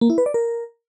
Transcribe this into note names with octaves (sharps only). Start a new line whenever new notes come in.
A#3
E4
B4
D5
A#4